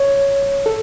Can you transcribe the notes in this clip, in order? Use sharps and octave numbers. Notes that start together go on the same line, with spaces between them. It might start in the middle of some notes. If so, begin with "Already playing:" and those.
Already playing: C#5
A4